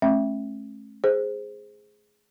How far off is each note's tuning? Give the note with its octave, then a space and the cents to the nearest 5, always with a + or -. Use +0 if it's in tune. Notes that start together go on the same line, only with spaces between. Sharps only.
A3 -35 C#4 -40 E5 +0
G#4 +0 C5 +0